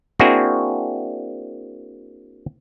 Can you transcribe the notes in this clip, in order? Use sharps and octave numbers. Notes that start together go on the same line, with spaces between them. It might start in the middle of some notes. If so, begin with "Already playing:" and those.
A#3 C4 D4 E4 F#4 G#4